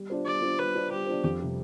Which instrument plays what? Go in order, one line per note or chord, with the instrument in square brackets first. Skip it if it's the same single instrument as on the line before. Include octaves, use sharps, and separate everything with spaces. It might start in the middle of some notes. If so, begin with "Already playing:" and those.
Already playing: [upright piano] G3
D4 F4 C5
[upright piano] G3 [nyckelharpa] D5
[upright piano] D4 F4 C5
[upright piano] G3 [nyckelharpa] B4
[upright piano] D4 F4 C5
[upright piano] G3 [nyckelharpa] G4
[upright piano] D4 F4 C5
F2
C3 G3